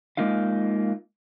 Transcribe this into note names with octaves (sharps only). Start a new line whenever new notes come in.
G#3 A#3 D#4 F4 F5